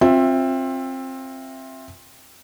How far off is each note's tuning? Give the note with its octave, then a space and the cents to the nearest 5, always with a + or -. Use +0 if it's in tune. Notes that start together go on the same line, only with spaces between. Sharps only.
C4 +20 F4 +20 E5 +0